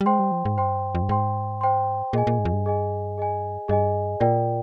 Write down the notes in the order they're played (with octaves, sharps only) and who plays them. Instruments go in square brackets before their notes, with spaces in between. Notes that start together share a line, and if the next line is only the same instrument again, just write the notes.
[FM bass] G3
[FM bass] G#3 [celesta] C5 G5 C6
[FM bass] G3
F3
G#2
[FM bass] G2 [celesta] C5 G5 C6
[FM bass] F2
G2
[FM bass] G#2 [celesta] C5 G5 C6
[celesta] C5 G5 C6
[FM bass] A#2 [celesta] G#4 D#5 G#5
[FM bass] A#2
G#2
F2
G2
[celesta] G#4 D#5 G#5
G#4 D#5 G#5
[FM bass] G2 [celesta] G#4 D#5 G#5
[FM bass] A#2 [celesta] F4 A#4 D5 G5